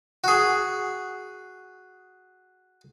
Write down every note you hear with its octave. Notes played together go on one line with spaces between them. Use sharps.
F#4 G#4